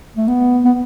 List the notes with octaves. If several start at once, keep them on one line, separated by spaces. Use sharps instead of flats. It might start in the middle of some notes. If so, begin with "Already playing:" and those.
A3
B3
B3